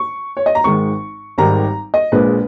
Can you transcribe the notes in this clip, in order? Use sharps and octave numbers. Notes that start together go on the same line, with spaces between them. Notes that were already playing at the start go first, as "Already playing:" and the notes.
Already playing: C#6
C#5
D#5
A#5
G#1 G#2 D#3 G#3 C#6
G#1 G#2 D#3 G3 A#5
D#5
A#1 A#2 G#3 B4